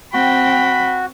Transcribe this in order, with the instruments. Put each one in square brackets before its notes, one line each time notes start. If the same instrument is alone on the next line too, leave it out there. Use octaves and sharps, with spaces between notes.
[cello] C4 G5 [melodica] F#4 [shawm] B5